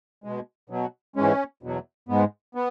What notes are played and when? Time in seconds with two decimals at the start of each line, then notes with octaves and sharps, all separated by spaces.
0.24 B2 G#3
0.70 B2 F#3
1.16 G#2 E3 G#3 C#4
1.63 E2 B2 F#3
2.09 G#2 G#3 B3
2.55 B3